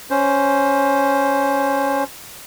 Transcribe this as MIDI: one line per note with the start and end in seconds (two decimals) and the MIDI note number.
0.10 2.04 61
0.10 2.04 72